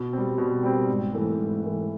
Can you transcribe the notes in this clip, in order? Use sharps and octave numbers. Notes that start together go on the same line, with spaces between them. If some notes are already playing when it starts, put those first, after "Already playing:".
Already playing: B2
G3 C4
B2
G3 C4
G#2
E3 A3
G#2
E3 A3